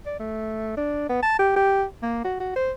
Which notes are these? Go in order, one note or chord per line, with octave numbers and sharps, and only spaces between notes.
D5
A3
D4
B3
A5
G4
G4
A#3
F#4
F#4
C5